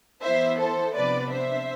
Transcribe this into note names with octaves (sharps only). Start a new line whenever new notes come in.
E3 B3 E4 C5 E5
A4 C5
C3 F3 B3 D4 B4 D5
C5 E5